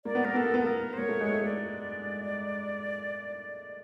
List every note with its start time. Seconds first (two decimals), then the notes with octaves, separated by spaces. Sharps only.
0.05 A#3 D5
0.15 B3
0.25 A#3 A#4
0.34 B3 A4
0.44 A#3
0.54 B3
0.60 A4
0.64 A#3 A#4
0.93 C5
0.97 A#3 C#5
1.09 A3
1.21 G#3
1.32 A3
1.44 A3 D5